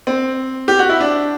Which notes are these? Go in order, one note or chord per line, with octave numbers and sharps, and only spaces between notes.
C4
G4
F#4
E4
D4